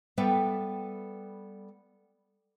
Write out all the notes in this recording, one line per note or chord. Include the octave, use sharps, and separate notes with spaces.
G3 B3 A4 B4 E5 G5